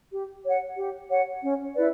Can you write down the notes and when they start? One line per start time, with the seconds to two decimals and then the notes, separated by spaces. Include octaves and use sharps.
0.11 G4
0.44 C#5 F#5
0.77 G4
1.10 C#5 F#5
1.42 C#4
1.75 E4 B4 D5